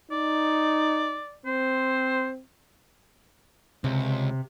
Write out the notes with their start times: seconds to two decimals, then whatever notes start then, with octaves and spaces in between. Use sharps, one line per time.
0.11 D#4 D5
1.46 C4 C5
3.84 C#2 C3